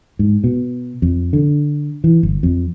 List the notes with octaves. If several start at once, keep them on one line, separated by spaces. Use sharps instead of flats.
G#2
B2
F2
D3
E3
G1
F2